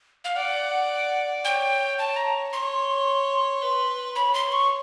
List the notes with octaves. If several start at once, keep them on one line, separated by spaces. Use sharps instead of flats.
F5
D5 F#5
C#5 G5
A5
A#5
C#5 C6
B4
C#5 B5
C6
C#6